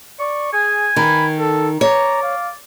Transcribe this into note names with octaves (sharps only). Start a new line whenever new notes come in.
D5 C#6
G#4 G#5
D#3 B5
A4
C#5 D5 A#5
F5